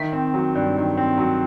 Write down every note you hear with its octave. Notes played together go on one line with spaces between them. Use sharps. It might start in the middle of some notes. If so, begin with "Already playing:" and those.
Already playing: D#3 E5
C4
F#3
G2
D#3
C4
F#3